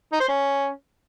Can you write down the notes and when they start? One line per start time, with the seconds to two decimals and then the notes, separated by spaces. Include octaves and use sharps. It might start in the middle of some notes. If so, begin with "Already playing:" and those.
0.12 D#4
0.20 C5
0.28 C#4